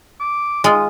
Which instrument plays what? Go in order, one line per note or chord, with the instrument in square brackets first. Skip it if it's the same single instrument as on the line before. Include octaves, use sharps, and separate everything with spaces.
[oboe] D6
[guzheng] G#3 F4 [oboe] D#6